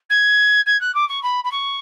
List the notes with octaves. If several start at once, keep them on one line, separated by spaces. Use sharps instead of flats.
G#6
G#6
F#6
D6
C#6
B5
B5
C#6